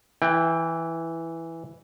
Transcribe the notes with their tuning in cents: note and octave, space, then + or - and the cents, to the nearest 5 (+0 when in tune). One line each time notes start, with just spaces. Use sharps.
E3 +0 G5 +20